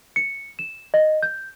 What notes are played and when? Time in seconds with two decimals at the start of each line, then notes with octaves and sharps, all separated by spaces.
0.16 C#7
0.59 E7
0.94 D#5
1.23 G6